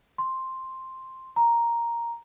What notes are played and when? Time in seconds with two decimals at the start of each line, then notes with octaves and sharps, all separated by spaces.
0.18 C6
1.36 A#5